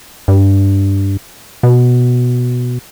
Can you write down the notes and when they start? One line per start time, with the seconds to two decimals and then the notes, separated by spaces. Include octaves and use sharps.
0.28 G2
1.63 B2